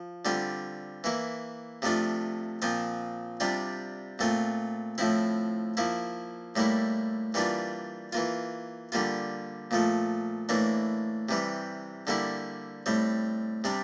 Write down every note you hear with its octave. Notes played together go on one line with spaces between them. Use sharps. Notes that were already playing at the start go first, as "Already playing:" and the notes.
Already playing: F3
D3 G3 C4 F4
E3 A#3 E4
C3 F3 A3 D4 F4
A#2 F3 C4 F4
C3 G3 D4 F4
A#2 A3 C4 F4
A2 F3 C4 E4
F3 A#3 E4
A2 G3 A#3 E4
E3 G3 A#3 D4 F4
E3 A#3 F4
D3 G3 A#3 F4
A#2 F3 A3
A2 E3 A#3 D4
C3 E3 G3
D3 G3 A#3 E4
A2 G3 C4
C3 G3 D4